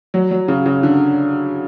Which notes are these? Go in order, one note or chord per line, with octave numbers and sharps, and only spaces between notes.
F#3
F#3
C#3
C#3
D3